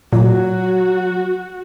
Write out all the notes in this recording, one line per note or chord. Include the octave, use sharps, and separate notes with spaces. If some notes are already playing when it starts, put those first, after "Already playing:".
A#2 F#3 F#4